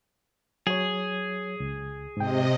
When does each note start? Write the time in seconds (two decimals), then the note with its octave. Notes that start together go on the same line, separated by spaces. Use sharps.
0.67 F#3 G#4 C#5
1.60 C#2
2.17 G#2 C3 D#5 G5